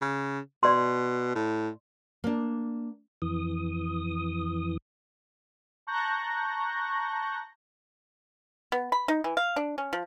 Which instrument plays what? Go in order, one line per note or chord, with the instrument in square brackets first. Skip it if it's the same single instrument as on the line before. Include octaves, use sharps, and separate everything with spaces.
[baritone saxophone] C#3
[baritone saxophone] B2 [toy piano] D5 C6
[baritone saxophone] A2
[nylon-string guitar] A#3 D4
[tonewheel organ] F2 E3 D#6
[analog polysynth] A5 A#5 C#6 F#6 G6 A#6
[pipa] B3
B5
D#4
E3
F5
D4
C#4
F3